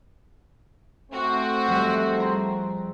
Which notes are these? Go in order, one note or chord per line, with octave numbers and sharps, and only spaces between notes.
A3 C4 F#4
F2 G3
G#4 A#5 C6